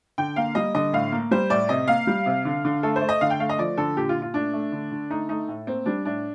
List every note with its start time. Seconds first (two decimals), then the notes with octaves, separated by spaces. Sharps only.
0.18 D3 G5
0.36 A#3 F5
0.55 G3 D#5
0.75 D3 D#5
0.93 A2 F5
1.12 A#3
1.31 G3 C5
1.50 A2 D5
1.69 C3 D#5
1.88 A#3 F5
2.07 G3
2.26 C3
2.45 D3
2.65 D3
2.83 A3 A4
2.96 C5
3.02 A3
3.09 D#5
3.21 D3 F5
3.30 G5
3.40 A3 F5
3.49 D#5
3.58 F3 D5
3.77 D3 A4
3.97 A#2 G4
4.09 F4
4.16 A#2
4.22 F4
4.34 A3 D4
4.53 A3
4.72 D3
4.92 D3
5.10 A3 D#4
5.29 A3 D#4
5.48 A2
5.67 A#3 C4
5.86 G3 D4
6.05 A2 D4